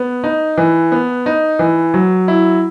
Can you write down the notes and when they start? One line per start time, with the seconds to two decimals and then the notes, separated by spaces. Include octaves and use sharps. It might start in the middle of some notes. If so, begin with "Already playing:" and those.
Already playing: B3
0.24 D#4
0.58 E3
0.92 B3
1.26 D#4
1.59 E3
1.94 F#3
2.28 E4